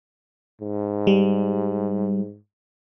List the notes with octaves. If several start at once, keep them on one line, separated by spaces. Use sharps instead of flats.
G#2
G3